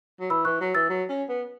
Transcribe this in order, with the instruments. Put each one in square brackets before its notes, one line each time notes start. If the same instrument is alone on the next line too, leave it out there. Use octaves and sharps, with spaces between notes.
[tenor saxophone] F#3
[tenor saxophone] E3 [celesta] B5 E6
[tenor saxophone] E3 [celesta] C#6 F#6
[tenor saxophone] F#3
[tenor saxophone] E3 [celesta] E6 A6
[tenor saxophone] F#3
C#4
B3